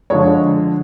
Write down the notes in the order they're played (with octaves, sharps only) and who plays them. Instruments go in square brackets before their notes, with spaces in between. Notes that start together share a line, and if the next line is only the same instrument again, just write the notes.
[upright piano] D3 F3 G#3 C#5